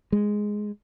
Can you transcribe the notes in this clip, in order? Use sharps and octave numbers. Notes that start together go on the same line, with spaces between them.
G#3